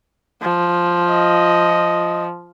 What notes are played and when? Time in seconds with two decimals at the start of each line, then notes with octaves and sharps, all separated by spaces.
0.42 F3
1.09 D#5